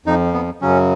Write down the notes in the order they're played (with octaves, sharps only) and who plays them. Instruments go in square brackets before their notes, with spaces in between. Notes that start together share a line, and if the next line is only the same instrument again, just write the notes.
[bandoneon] F2 F3 D#4
B3
F#2 C#3 F#3 C#4